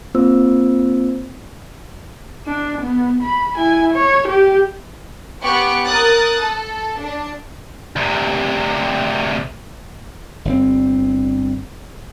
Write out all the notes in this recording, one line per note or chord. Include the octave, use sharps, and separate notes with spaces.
A#3 C4 F4 C5 E6
D4
B3
B5
E4 G#5
C#5
G4
B3 G4 C#6 D6 F#6 C#7
A#4 D#6 F#6 A6
A4
D4
D2 C3
G1 B2 C4